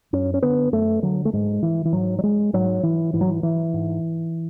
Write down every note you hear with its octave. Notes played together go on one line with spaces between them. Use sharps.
F#2 C#4
C#4
D3 B3
F#2 A3
D3 F#3
A3
G#2 G#3
E3
E3
G#2 F#3
F#3
G#3
G#2 F#3
E3
G#2 E3
F#3
E3
E3
G#2